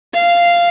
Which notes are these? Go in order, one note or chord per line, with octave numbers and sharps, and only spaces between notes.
F5